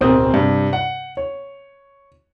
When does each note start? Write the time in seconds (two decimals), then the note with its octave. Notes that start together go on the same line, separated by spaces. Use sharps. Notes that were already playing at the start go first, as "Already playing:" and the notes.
0.01 D1 B1 C4 A#4 D#6 G6
0.34 G2 C3
0.73 F#5
1.17 C#5